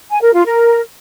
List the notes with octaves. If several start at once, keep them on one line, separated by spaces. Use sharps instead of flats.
G#5
A#4
F4
A#4